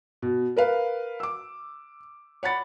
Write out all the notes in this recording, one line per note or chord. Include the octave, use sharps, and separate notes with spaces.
B2
A#4 B4 F5
D6 E6
C#5 F#5 B5 A6 C#7